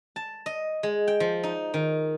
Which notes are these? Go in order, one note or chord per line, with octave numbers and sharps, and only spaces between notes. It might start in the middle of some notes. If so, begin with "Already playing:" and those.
A5
D#5
G#3
G5
F3
D#4
D#3